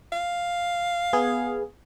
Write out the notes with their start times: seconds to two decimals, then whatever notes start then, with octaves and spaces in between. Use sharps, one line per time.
0.13 F5
1.13 B3 G#4